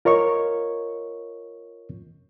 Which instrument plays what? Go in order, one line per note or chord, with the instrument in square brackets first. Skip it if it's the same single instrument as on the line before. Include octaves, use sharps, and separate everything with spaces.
[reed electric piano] F4 A#4 C#5 D#5 C#6